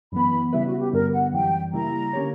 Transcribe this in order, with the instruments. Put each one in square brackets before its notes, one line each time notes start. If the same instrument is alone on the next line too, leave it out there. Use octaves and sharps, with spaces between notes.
[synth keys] F#2 E3 B3 [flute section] B5
[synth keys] C#3 G3 B3 E4 B4 [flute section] E5
[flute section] F#4
G4
[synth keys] G2 D3 G3 B3 [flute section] A#4
[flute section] F#5
[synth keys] F#2 E3 G3 [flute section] G5
[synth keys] C#3 G3 A#3 E4 [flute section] A#5
[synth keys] D3 A#3 C#4 G4 C#5